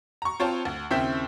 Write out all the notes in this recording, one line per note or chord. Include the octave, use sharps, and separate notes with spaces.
A#5 C#6
C4 F4 C#5 G5 A5
D2
D#2 C#3 C4 E4 G6 B6